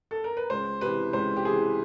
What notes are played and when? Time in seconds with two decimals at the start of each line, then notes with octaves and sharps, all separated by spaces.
0.11 A4
0.24 A#4
0.37 B4
0.50 C#2 C5
0.81 C3 E3 B4
1.13 C#2 C5
1.37 G4
1.45 C3 E3 G#4